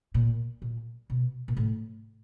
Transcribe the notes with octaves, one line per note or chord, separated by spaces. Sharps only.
A#2
A#2
B2
A#2
A2